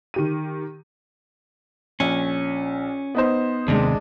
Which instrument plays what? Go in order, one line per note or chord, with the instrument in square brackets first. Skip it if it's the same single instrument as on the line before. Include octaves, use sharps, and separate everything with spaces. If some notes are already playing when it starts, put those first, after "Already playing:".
[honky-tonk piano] D#3 G4 D#7
[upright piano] A#1 [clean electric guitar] C#4
[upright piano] B3 D#4 C5
[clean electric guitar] D#2 C3 [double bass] G#3 D4